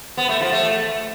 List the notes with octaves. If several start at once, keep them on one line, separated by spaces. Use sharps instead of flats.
B3
A3
F3
A3